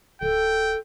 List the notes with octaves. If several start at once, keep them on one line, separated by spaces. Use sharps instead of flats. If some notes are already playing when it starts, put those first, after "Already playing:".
D1 A4 G5